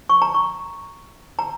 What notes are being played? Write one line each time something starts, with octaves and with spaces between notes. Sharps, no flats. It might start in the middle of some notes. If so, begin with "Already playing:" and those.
C#6
A#5
C#6
A#5